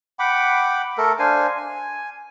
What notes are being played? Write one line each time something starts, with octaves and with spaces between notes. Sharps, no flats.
F#5 G5 B5 D6
A3 A4 A#4
D4 C5 F5 G#5
G#5